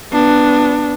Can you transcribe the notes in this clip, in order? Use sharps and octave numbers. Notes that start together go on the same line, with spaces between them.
B3 D4